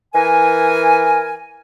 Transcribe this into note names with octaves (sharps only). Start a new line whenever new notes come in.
E3 A#4 G#5